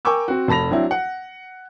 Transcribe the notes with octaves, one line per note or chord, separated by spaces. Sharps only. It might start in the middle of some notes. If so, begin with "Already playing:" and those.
A#4 G5 G#5 C#6 D6 E6
C4 F#4
F1 A5 B5 A#6 F7
F#3 C4 D4 E4
F#5